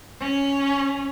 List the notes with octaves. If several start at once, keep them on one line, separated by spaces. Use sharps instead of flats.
C#4